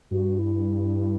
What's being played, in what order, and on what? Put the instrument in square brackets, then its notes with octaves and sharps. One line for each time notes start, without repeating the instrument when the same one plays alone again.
[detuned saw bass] G2 [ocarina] F#4
[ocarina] E4